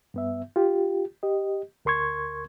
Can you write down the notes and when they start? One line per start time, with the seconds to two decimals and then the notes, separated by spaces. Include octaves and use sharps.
0.14 G2 B3 E5
0.56 F4 G4
1.23 G4 D#5
1.85 D2 A#4 C6 C#6 G#6